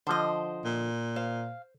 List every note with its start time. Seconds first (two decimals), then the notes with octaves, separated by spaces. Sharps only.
0.07 D3 F3 C5 D#5
0.65 A#2
1.16 C5 F5